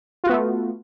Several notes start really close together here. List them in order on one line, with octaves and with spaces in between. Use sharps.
F4 F#4 B3 A3